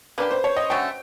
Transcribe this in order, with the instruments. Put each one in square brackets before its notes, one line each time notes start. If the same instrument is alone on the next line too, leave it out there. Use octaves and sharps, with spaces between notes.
[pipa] A#3 D4 G4 [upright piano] B4
[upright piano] C5
C#5
D#5
[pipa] D3 F#3 A3 C#4 [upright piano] G5